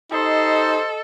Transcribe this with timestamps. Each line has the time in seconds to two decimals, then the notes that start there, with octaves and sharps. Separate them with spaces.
0.12 D#4 G4 A4 C5 D#5 B5